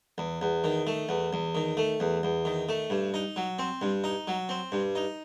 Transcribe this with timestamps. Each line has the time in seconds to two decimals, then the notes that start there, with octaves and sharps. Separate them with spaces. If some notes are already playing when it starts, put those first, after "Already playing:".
0.18 E2
0.41 E2
0.64 D#3
0.87 A3
1.09 E2
1.33 E2
1.55 D#3
1.77 A3
2.00 E2
2.23 E2
2.45 D#3
2.69 A3
2.90 G2
3.14 D#4
3.36 F#3
3.59 C4
3.82 G2
4.04 D#4
4.28 F#3
4.49 C4
4.72 G2
4.96 D#4